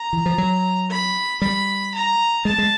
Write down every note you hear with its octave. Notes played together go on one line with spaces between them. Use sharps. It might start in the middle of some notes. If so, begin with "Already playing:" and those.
Already playing: A#5
E3
F3
F#3
B5
G3 B5
A#5
G#3 A5
G#3